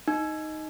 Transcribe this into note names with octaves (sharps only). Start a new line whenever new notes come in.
D#4